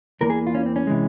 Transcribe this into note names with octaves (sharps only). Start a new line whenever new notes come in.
E2 E3 A#3 A#4
G#4
F4
C#4
C4
C#4
C3 E3 G#3